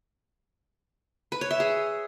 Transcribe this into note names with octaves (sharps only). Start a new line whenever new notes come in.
B4
C#5
E5
G#4